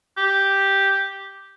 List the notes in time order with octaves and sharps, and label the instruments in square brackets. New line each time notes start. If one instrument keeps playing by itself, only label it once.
[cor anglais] G4